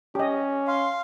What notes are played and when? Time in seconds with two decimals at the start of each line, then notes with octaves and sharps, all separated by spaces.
0.15 C#4 G4 D#5
0.67 F5 C6